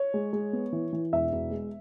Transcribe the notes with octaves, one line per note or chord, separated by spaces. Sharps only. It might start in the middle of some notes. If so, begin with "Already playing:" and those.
Already playing: C#5
G#3
G#3
B3
E3
E3
E1 E5
E1
G#3